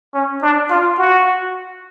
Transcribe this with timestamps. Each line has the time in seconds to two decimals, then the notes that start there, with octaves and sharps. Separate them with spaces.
0.14 C#4
0.43 D4
0.70 F4
0.98 F#4